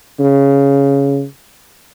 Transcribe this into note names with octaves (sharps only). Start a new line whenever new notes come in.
C#3